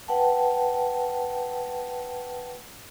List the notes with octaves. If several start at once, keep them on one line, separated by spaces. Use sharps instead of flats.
B4 F#5 G5 A5